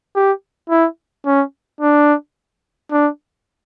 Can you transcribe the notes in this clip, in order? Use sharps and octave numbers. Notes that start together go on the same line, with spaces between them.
G4
E4
C#4
D4
D4